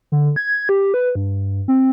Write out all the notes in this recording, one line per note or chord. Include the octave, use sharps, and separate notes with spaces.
D3
G#6
G4
B4
G2
C4